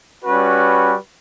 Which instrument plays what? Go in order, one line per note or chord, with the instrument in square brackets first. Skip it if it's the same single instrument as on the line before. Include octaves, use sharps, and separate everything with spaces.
[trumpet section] G3 C#4 F#4 B4